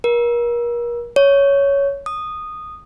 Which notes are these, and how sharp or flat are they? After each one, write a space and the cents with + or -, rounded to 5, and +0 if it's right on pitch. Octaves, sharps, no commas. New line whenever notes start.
A#4 +35
C#5 +10
D#6 -10